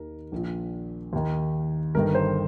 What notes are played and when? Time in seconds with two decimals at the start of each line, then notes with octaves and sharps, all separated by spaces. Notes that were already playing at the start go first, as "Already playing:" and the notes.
Already playing: D#2 D#3 A#4
0.32 A#1 A#2
1.13 D#2 D#3
1.95 G1 G2 D#3 A#4
2.15 C5